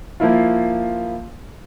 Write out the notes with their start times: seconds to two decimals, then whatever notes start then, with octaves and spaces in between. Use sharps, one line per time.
0.20 F3 A#3 E4 F4